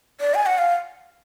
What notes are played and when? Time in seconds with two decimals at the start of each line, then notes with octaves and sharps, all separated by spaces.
0.21 D5
0.35 G#5
0.46 F#5
0.58 F5